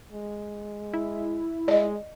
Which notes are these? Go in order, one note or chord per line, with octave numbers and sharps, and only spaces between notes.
G#3
E4
G#3 D5 D#5